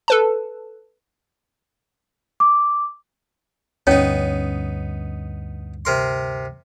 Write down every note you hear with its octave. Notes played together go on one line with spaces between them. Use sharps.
A4 B4 A5
D6
D2 G2 B3 C#4 D#4 C#5
C3 A#4 C6